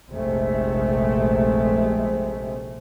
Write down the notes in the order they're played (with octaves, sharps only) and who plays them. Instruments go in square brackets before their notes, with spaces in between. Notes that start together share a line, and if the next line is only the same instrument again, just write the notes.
[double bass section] F1 A#1 C3 G#3 A3